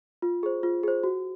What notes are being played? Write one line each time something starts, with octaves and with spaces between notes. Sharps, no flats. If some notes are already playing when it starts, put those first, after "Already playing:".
F4
G#4 C5
F4
G#4 C5
F#4